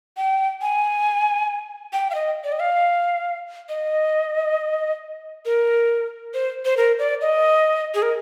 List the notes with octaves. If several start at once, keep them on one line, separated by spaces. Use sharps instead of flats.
G5
G#5
G5
F5
D#5
D5
D#5
F5
D#5
A#4
C5
C5
A#4
D5
D#5
G#4
A#4